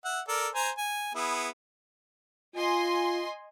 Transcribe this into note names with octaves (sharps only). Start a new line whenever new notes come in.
E5 F#5
A4 A#4 D5
C5 G#5 A#5
G#5
B3 E4 G#4
F4 D#5 G#5 C6